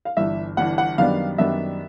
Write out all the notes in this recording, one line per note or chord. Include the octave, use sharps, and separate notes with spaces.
F5
G1 G2 E3 E5
G1 G2 E3 F#5
F#5
F#2 D#3 G3 B3 D4 F5
F#2 D#3 G3 B3 D4 E5